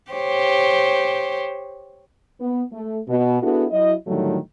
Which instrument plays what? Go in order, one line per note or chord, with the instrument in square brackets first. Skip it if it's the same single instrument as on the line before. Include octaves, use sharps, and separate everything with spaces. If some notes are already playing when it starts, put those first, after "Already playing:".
[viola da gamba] G4 C5 C#5
[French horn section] B3
A3
B2
B3 D4 E4 F#4 G#4 A4
F#3 E4 D#5
A2 D3 D#3 F#3 G3 A3